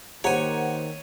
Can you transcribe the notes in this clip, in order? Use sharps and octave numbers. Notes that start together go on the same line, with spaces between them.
D#3 A#3 G4 C5 C#5 F#5 G#5 A#5